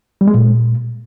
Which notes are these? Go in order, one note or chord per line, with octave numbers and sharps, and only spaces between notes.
G3
G#3
A#2